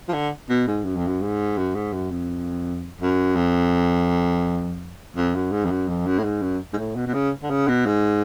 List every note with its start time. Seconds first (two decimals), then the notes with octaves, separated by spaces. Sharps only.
0.09 F3
0.13 D3
0.49 B2
0.67 G#2
0.84 F#2
0.96 F2
1.07 F#2
1.21 G#2
1.57 F#2
1.75 G#2
1.93 F#2
2.11 F2
3.01 F#2
3.36 F2
5.16 F2
5.35 F#2
5.51 G#2
5.65 F2
5.71 F#2
5.89 F2
6.06 F#2
6.19 A2
6.24 G#2
6.42 F#2
6.73 G#2
6.77 A2
6.96 B2
7.07 B2
7.14 C#3
7.43 D3
7.50 C#3
7.68 B2
7.86 G#2